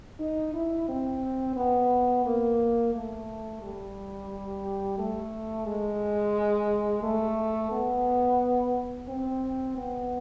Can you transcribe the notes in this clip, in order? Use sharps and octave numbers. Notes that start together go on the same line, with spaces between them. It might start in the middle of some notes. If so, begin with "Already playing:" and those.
D#4
E4
C4
B3
A#3
A3
G3
A3
G#3
A3
B3
C4
B3